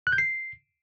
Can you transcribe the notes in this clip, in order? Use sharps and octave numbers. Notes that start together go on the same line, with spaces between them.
F#6
G6
C7